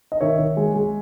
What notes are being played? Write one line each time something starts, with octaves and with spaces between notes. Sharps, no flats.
D#5
D#3 C#5 E5
D#3
G#3
G#3